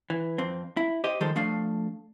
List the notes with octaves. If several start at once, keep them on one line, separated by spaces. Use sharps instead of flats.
E3
F2 C4
E4
G4 C5 D#5
D#3 F3 G3 G#3 A4 C5
F3 A3 D4 F5